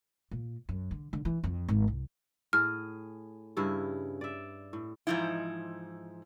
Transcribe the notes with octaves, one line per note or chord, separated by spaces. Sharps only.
A#2
F#2
D3
D3
E3
F2
G#1
C2
A2 G#4 F6
G2 C#3 E4
D5 E5
A2
G#2 E3 F3 D#4 E4